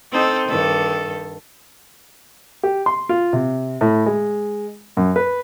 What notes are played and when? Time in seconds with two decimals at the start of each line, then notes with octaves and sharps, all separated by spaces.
0.12 C4 D#4 A4
0.48 G2 D#3 A4
2.63 G4
2.86 C6
3.09 F4
3.33 C3
3.81 A2
4.06 G#3
4.97 F#2
5.16 B4